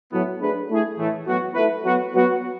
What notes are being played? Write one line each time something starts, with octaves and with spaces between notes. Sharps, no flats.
A2 F#3 B3
A3 D4 G#4 B4
A3 E4 G#4
A2 E3 A3
A2 F#3 B3 F#4
A3 E4 B4
F#3 B3 F#4
F#3 B3 F#4